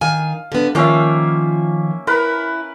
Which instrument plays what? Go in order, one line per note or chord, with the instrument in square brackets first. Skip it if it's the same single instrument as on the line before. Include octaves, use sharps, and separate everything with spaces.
[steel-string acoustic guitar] D#3 G#5 [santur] F5
[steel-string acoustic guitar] D3 B3
[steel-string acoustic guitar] D#3 F3 F4 [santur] A#3 C#4 E5
[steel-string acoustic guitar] E4 [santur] A#4 B4 B5